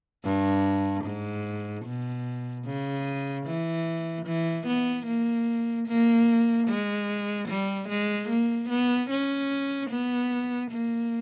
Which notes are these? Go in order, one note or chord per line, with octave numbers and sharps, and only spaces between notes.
G2
G#2
B2
C#3
E3
E3
B3
A#3
A#3
G#3
G3
G#3
A#3
B3
C#4
B3
A#3